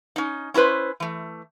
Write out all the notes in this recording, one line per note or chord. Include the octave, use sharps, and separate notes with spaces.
C#4 D#4
C#4 E4 A4 B4 C5
E3 A3